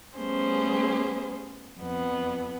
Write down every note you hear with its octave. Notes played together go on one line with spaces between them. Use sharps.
G3 A3 B3 C#4 G#4 C5
F2 B3